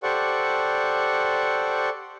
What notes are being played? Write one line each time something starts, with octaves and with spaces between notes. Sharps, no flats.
G4 A4 C5 D5 F#5 C#6